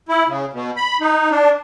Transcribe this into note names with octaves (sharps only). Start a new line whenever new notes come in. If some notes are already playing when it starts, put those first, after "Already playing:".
E4
C#3
B2
B5
D#4
D4